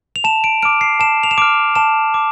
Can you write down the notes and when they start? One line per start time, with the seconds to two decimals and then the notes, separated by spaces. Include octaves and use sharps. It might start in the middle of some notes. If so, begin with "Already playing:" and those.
0.16 F7
0.24 A5 E7
0.44 D7
0.62 D6 F6 D7
0.81 C7
1.00 A5 E7
1.23 F7
1.31 E7
1.38 D6 F6 D7
1.75 A5 E7
2.14 D6